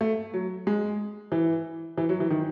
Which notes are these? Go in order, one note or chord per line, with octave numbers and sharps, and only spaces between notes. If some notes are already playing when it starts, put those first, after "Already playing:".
A3
F#3
G#3
E3
E3
F#3
E3
D#3